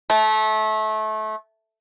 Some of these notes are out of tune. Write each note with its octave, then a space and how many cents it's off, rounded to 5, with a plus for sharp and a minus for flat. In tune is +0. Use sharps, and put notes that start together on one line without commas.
A3 -25